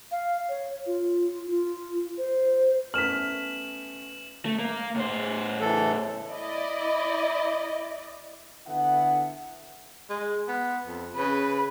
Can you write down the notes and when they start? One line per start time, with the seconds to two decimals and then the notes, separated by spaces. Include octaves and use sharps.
0.11 F5
0.49 C#5
0.87 F4
1.50 F4
2.18 C5
2.94 A3 B3 C#4 F6 B6 E7 F#7
4.46 A3
4.59 A#3
4.96 A2 C5
5.60 E3 A4
6.30 E4 D5 D#5
8.67 D3 B3 E4 A4 F#5
10.10 G#3
10.48 B3
10.86 F2
11.16 C#3 B4